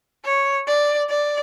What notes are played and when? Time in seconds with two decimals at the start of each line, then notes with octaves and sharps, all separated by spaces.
0.25 C#5
0.67 D5
1.09 D5